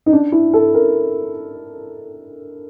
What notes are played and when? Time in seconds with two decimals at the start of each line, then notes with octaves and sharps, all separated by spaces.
0.06 D#4
0.13 D4
0.32 E4
0.53 A4
0.74 A#4